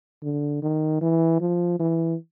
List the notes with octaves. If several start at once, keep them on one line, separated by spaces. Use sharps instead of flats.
D3
D#3
E3
F3
E3